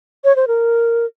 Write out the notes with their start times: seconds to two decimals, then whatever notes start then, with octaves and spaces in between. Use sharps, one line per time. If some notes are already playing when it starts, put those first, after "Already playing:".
0.24 C#5
0.36 C5
0.48 A#4